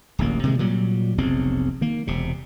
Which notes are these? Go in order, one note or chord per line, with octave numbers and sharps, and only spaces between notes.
D1 A1 A#3
C3 D#3 F#3 G#3
A#2 F#3 G3
F1 B1 C#3 C4
D#3 A#3
E1 C3